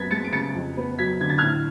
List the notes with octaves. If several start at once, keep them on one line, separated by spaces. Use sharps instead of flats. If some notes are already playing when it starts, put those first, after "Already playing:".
Already playing: F#2 B3 G#6 A6 B6
G#3 A6 C#7
D7
C#3 A6 C#7
F2
B3
F#3 G#6 B6
D3 G#6
A6
A2 F6 G#6